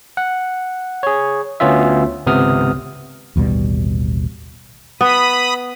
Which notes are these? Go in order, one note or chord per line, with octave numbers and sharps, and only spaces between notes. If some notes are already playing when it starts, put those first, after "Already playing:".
F#5
G#4 C#5
D2 B3 C#4 F4 E5
G#1 C#2 C3 B3 D#6 F6
A1 D#2 B2 G3
B3 B5 D#6